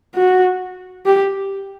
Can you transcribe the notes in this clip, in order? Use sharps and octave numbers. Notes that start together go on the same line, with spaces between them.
F#4
G4